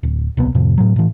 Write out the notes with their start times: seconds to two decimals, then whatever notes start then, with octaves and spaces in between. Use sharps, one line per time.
0.03 D1
0.37 D1 B1 C3 B3
0.55 F2 A2 C3 F3
0.78 A2 F#3
0.96 A2 E3